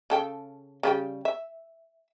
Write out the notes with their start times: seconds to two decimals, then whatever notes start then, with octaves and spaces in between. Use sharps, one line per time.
0.10 C#3 A4 G5
0.83 C#3 G3 G5
1.25 E5